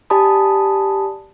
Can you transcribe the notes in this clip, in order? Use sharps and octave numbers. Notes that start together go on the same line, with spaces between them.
G4 D5 G#5 A5 B5 D#6